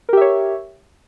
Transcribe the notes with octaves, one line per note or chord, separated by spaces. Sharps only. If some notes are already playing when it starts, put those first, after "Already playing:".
G4 A#4 C#5 E5